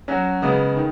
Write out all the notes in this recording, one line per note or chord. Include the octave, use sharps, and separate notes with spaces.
F#3 C#4 F#4
C#3 G#3 B3
D#3